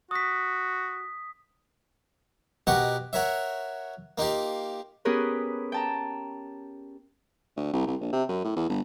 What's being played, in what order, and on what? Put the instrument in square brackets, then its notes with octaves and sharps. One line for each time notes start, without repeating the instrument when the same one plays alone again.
[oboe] F#4 [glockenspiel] D#6 B6
[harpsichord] B2 F#4 G4 A#4 D#5 C#6
F#4 A#4 C#5 E5
A#3 D#4 F4 G4
[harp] B3 C#4 G4 G#4 A#4 B4
G5 A5 A#5
[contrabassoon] D2
C2
C2
A#1
C3
F#2
A2
E2
G1